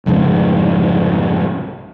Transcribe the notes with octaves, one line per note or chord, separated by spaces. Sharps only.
C2 F2 G#2 C#3